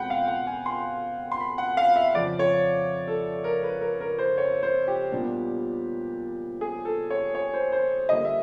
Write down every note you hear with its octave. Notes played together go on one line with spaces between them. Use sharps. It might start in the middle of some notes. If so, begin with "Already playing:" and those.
Already playing: B2 G#3 C4 F#5 G5 B5
F5
F#5
G#5
C6
C6
B5
F#5
F5
E5
F2 C#3 F3 D5
C#5
A4
A#4
B4
A#4
A#4
C5
C#5
C5
G4
A#2 G3 B3 D4
G#4
A4
C#5
C#5
C5
C5
D3 G3 A#3 D#5
E5